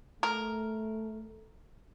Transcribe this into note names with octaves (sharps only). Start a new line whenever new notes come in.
A3 A#4